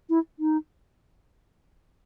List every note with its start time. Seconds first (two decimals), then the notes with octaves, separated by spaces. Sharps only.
0.10 E4
0.39 D#4